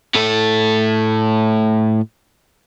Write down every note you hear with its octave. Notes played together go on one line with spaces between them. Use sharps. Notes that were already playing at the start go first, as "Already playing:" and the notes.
A2 A4